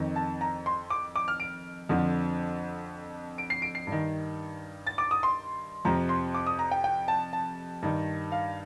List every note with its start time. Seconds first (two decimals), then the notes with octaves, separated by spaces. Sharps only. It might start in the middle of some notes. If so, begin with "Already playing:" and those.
Already playing: F2 D#3
0.16 A5
0.41 A#5
0.66 C6
0.90 D6
1.16 D6
1.28 F6
1.40 D7
1.89 F2 D3 F3
3.38 D7
3.50 C7
3.62 D7
3.75 C7
3.87 G2
3.92 D#3
4.87 A6
4.98 D6
5.11 D#6
5.23 C6
5.85 F2 C3 F3 A#5
6.09 C6
6.34 D6
6.47 D#6
6.59 A#5
6.71 G5
6.84 G5
7.08 A5
7.33 A5
7.82 G2 D#3
8.32 F5